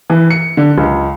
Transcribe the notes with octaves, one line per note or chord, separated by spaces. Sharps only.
E3
C#7
D3
C#2